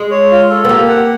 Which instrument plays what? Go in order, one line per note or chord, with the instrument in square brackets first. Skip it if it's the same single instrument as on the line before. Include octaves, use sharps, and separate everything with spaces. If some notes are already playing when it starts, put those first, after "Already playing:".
Already playing: [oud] G#3
[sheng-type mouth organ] C#5
F4
A4
[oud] B3
[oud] A#3 [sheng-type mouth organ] G4
[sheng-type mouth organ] F#5